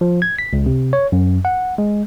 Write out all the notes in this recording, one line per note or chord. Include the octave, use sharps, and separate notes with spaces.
F3
G#6
B6
C#2
C3
C#5
F#2
F#5
G#3